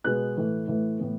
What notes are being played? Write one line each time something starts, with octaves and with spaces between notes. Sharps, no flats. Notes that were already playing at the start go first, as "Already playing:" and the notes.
B2 G#3 B3 F#6
A2 E3 A3
A2 E3 A3
A2 E3 B3